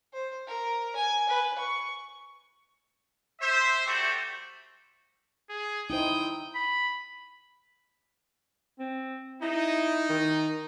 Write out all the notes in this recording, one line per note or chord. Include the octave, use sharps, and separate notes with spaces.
C5
A#4
G#5
B4
C#6
C5 E5
G3 A3 F#4 G4 C5
G#4
D#4 E4 C5 G5 D#6
B5
C4
D#4 E4
D#3